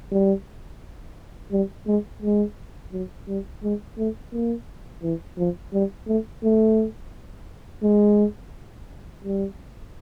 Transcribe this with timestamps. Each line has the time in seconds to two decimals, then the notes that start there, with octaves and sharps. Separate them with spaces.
0.12 G3
1.52 G3
1.87 G#3
2.22 G#3
2.92 F#3
3.28 G3
3.63 G#3
3.98 A3
4.33 A#3
5.03 E3
5.38 F3
5.73 G3
6.08 A3
6.44 A3
7.83 G#3
9.24 G3